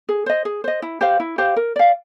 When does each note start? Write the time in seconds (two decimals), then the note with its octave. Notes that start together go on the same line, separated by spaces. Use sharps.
0.09 G#4
0.26 C5 D#5
0.45 G#4
0.64 C5 D#5
0.82 E4
1.01 G4 C5 F5
1.20 E4
1.38 G4 C5 F5
1.56 A#4
1.76 D5 F5